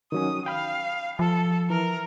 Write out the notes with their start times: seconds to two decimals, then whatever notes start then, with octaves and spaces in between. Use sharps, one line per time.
0.12 D#3 F#3 C#4 D#6
0.46 F5 G5 B5 F6
1.19 F3 A4
1.70 E3 A#4